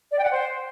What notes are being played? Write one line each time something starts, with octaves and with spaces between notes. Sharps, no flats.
D5
G5
F#5
C5